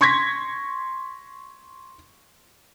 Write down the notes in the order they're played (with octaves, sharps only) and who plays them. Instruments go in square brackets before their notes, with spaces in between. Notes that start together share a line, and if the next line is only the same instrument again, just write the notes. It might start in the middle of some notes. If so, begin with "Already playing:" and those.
[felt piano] C6 C#6 G#6 A#6 B6